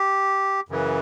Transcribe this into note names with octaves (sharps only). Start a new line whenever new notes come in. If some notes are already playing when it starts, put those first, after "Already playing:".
Already playing: G4
F#2 C#3 E3